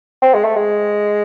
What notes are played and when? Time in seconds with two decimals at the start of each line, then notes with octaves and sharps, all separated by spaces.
0.22 C4
0.34 G#3
0.45 A3
0.56 G#3